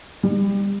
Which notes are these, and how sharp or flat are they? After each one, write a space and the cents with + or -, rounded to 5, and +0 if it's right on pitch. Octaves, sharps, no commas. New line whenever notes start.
G3 +30